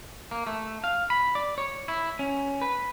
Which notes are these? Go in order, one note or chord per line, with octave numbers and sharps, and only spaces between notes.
A#3
A3
F5
B5
D5
C#5
E4
C#4
B4